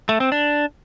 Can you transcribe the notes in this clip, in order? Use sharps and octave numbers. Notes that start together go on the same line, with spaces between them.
A3
C4
D4